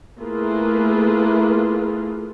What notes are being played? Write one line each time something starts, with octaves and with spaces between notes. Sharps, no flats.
A3 A#3 E4 F4 G#4 B4